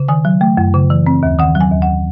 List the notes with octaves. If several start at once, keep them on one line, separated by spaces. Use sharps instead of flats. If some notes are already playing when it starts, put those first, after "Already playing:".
Already playing: C#3
D#3 G#5
F#3
A3
F#2
C#3
E3
C4
D#2
D#3 F#5
F#3
G#5
D#2
F#5